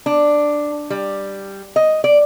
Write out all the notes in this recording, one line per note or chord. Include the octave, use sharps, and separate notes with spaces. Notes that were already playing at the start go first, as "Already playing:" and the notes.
D4
G3
D#5
D5